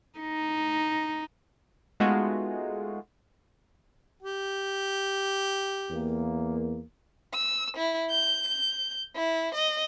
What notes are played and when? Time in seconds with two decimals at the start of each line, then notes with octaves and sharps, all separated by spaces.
0.19 D#4
2.00 G#3 A3 B3 D#4 F4 F#4
4.22 G4
5.91 E2 A#3
7.34 E6
7.77 E4
8.10 G6
8.48 G6
9.16 E4
9.55 D#5